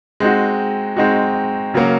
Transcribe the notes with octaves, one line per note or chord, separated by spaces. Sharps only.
G#3 C4 D#4 F#4
G#3 C4 D#4 F#4
C#3 F#3 A#3 C#4